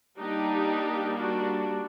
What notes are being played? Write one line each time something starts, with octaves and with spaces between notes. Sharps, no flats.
G3 A#3 D4 D#4 G4
D4 F#4